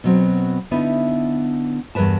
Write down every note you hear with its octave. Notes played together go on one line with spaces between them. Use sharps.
B2 F#3 C4
D3 B3 D#4 E4
E2 G2 B2 A#4 B4 A5